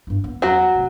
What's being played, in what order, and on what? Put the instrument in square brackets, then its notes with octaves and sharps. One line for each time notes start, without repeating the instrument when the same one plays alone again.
[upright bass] G2 E4
B3
[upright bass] E2 [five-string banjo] F#3 F#4
[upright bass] F1